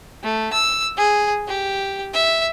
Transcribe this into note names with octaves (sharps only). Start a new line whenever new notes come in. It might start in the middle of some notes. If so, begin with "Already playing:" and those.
A3
E6
G#4
G4
E5